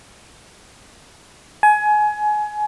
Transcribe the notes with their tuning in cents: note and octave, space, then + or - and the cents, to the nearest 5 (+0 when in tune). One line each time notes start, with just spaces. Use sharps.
G#5 +25